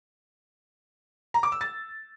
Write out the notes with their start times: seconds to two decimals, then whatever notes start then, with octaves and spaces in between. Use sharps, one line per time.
1.34 A#5
1.43 D6
1.52 E6
1.61 A6